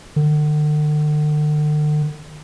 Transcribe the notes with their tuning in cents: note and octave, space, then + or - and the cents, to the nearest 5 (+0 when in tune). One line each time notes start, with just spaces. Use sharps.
D3 +45